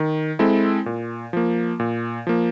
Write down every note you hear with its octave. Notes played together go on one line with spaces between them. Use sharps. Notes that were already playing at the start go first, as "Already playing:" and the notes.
Already playing: D#3
G#3 C4 E4 A4
A#2
F3 A#3
A#2
F3 A#3